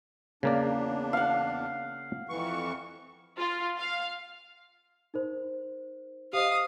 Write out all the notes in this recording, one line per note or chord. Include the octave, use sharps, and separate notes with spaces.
E2 C#3 A#3 D4 D5
F5 F#5
F2 E3 C#6
F4
F5
D#4 A#4 C5
G4 C5 D#5 F5 D#6